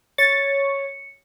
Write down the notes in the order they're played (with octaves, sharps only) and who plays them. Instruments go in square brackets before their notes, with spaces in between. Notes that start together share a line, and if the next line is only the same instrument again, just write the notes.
[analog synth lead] C#5 [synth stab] A6 [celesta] C#7